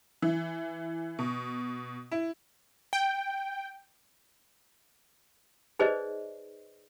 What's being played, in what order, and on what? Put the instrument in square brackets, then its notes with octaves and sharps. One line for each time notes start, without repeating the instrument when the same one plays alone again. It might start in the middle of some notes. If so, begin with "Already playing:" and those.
[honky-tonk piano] E3
B2
E4
[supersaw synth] G5
[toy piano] D#4 G#4 B4 C5 D5 D#5